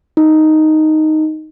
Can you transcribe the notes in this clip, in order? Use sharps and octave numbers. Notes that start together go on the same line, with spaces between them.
D#4